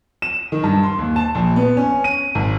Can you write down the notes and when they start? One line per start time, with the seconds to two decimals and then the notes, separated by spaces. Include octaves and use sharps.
0.22 E7
0.52 D#3
0.64 G2
0.83 C6
0.98 D#2
1.16 A5
1.35 A#1
1.56 B3
1.77 C#4
2.04 D#7
2.35 G#1